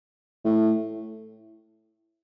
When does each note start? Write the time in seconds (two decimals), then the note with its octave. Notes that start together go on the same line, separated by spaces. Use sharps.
0.45 A2